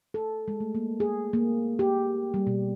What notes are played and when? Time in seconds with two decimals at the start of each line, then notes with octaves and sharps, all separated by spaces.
0.14 A4
0.48 G#3
0.60 A3
0.75 A#3
1.00 G#4
1.33 A#3
1.79 G4
2.34 G3
2.47 B2